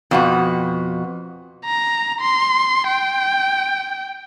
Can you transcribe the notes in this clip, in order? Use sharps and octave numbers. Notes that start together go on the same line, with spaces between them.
F2 B2 F#4
A#5
C6
G5